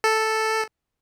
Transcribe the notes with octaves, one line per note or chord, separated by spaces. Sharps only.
A4